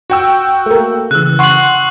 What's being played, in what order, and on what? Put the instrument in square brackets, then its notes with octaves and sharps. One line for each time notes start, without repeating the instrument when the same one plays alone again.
[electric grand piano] F#4 G5 E6
[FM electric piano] A3 A#3
[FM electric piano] C#3 E3 [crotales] E6 F#6
[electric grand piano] F#5 C6 [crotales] C#6 F#7